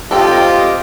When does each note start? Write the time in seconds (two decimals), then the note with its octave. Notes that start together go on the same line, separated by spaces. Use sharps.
0.11 C4 F4 G4 A4 D#5